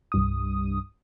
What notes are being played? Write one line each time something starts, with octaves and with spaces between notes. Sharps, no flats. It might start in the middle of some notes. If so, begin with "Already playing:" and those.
C2 G2 D#6